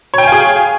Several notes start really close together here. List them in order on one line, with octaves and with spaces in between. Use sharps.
C#5 G5 G#5 F5 G#4